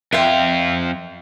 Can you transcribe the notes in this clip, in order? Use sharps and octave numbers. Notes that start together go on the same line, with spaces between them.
F2 F4 E5 G5